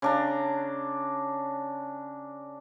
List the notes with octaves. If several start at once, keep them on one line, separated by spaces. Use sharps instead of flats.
C#3 D4 A#5